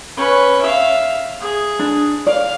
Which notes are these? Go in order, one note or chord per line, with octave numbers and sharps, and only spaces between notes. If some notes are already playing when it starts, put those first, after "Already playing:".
C#4 B4
E5 F5
G#4
D4
D5 F5